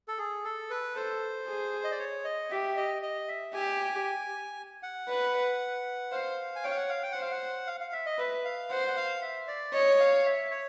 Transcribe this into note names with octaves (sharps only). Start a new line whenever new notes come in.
A4
G#4
A4
B4
A4 C5
G#4
D#5
D5
C#5
D#5
G4 E5
D#5
D#5
E5
G4 G#5
F#5
B4
C5 F5
G#5
C#5 G5
F5
F#5
F5
G5
C5 F#5
F5
F#5
F5
F5
E5
D#5
B4 E5
F5
C5 F#5
F#5
F5
E5
D5
C#5 D#5
F5
E5
C#5